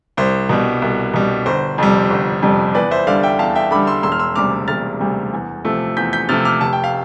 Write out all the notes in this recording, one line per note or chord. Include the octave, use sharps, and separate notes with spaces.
C2 C5
B2 G3
C2
B2 G3
G1 C5
F2 C3 G3
G1
F2 C3 G3
E2 B4 D5
C5 E5
D3 G3 D5 F5
E5 G5
E2 F5 A5
E5 G5
D3 G3 B5 D6
C6 E6
E1 C6 E6
F6
C6 E6
D2 C3 G3 D6 F6
E1 F6 A6
D2 C3 G3
E2
C3 F3 A3
E2 G6 B6
G6 B6
C3 F3 A3 F6 A6
D6 F6
F1 A5
G5
F5